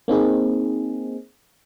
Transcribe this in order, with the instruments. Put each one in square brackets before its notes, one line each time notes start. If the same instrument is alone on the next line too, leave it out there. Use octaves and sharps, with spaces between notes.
[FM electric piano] A#3 C4 D#4 G#4